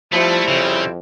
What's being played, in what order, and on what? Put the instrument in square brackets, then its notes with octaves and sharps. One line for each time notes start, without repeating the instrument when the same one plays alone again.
[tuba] F3 [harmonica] G3 C4 E4 [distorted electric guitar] A3
[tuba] F2 [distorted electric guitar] C#3